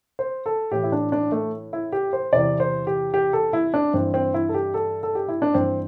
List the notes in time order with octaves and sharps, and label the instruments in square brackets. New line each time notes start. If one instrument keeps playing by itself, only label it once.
[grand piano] C5
A4
A2 E3 G4
E4
D4
D4
A3
E4
G4
C5
E2 C3 E3 D5
C5
G4
G4
A4
E4
D4
G2 E3 C4
C4
E4
A4
G4
A4
A4
G4
E4
D4
G2 E3 C4